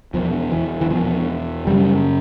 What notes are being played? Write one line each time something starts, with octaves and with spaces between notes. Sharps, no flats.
E2 B2 F3
E3
E3
E2 B2 F3
F#2 C#3 G3